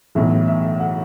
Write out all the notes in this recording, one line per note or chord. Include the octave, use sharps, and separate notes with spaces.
B1 A2 E3 A3 E5
E5
F#5